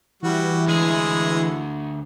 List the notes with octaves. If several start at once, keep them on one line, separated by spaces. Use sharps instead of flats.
E3 G3 E4 F#4
D2 G#3 G#4